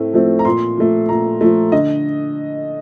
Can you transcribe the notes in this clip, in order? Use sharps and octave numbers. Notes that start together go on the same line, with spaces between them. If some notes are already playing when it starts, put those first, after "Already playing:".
Already playing: A2 A3 C4
F3 A3 C4
A#5
A#2 C6
F3 A3
A#2 A#5
F3 A3
D3 D#5